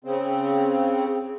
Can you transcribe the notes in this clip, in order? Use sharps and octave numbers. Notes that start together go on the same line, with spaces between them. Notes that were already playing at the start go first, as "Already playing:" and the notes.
C#3 C4